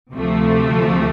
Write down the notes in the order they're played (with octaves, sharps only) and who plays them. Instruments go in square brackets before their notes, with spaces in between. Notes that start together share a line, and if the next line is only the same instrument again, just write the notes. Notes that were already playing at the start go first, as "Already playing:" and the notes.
[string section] D2 C3 F3 A3